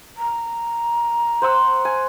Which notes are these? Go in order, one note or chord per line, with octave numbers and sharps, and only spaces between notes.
A#5
C5 F#5 E6
G#5